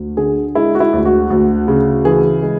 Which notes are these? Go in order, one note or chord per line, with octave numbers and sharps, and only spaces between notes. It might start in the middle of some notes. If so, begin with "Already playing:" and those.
Already playing: D2
D3 G#4
G#3 E4
F#4
E4
D2
F#4
D2
C#3
E3 G#4
G#3